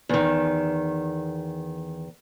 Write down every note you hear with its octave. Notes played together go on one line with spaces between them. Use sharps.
E2 D#3